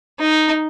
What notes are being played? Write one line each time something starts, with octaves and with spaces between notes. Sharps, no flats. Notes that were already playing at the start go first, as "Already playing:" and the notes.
D#4